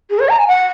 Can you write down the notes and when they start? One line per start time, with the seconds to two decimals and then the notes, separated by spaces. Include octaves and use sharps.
0.10 G#4
0.19 C#5
0.29 A#5
0.39 G#5
0.48 F#5